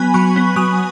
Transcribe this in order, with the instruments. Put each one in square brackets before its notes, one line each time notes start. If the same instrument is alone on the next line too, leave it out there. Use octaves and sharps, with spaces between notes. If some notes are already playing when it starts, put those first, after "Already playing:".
Already playing: [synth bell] F#3 B3 G#5 B5
F#3 C#6
B3
F#3 D#6